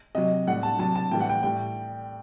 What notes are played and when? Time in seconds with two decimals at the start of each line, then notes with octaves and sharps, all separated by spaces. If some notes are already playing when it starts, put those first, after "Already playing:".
0.15 C3 F#3 D#5
0.47 A2 G3 F#5
0.63 A5
0.79 C3 F#3 A5
0.96 A5
1.11 A2 E3 G3 G5
1.20 F#5
1.29 G5
1.43 A2 G3 G5